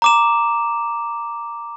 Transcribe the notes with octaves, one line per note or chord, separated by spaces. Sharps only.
A#5 D6 E7